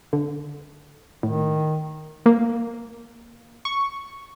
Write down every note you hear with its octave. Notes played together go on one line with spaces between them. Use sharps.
D3
A2 D#3
A#3
C#6